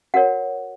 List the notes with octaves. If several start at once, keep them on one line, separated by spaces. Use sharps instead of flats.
F#4 A#4 C#5 F#5